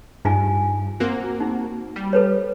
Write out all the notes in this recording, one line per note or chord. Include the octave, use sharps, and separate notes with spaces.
G2 D#4 F4 G#5
A#3 C4 F#4
D#4
G3
A4 B4 C#5